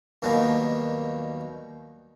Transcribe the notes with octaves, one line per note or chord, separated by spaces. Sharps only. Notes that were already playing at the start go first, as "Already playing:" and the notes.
D#2 B2 D#3 F#3 G3 A#3